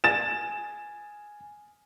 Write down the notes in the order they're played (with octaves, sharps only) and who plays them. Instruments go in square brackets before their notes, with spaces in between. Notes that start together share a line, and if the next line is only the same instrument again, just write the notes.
[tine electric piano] G#5 [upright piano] A6 E7